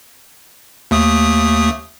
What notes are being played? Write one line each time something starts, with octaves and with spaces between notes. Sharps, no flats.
D#2 A3 D#6